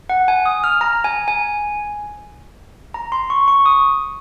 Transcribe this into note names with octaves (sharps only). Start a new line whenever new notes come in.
F#5
G#5
D#6
F6
A#5
G#5
G#5
A#5
C6
C#6
C#6
D#6